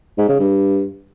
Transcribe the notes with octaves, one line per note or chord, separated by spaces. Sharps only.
G#2
C#3
G2